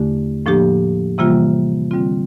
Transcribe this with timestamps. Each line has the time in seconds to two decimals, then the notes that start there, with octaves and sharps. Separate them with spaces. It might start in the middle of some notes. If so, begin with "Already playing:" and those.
Already playing: E2 D3 A3 D4 G4
0.46 A2 F3 A#3 D4 G4
1.18 C3 E3 G3 A#3 F4
1.91 D3 G3 C4 F4